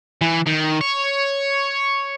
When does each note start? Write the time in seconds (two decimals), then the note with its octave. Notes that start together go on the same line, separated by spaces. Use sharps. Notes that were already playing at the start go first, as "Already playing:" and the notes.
0.21 E3
0.47 D#3
0.81 C#5